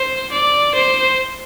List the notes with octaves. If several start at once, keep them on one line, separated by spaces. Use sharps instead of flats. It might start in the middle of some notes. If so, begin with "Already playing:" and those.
Already playing: C5
D5
C5